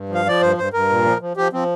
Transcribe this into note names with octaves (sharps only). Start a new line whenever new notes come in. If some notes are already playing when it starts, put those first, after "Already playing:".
Already playing: G2
F3
F5
F3 D5
G2 C5
G2 C5
G2 A#4
A#2
F3
F3
F3 G4
F3 C4